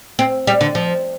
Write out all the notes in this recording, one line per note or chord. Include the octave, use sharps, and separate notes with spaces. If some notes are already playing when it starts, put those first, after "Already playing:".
C4
G3
D3
F3